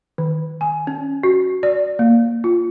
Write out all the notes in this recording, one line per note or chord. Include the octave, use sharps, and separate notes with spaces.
D#3
G#5
C#4
F#4
D5
A#3
F4